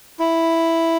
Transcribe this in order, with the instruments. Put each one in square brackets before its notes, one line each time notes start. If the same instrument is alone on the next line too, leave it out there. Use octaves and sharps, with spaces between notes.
[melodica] E4